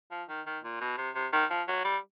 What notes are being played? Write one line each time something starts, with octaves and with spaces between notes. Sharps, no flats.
F3
D#3
D#3
A#2
B2
C3
C3
D#3
F3
F#3
G3